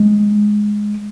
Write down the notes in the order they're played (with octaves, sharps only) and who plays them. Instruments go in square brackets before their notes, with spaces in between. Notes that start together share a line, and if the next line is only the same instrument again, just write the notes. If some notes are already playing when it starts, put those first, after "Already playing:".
Already playing: [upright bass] G#3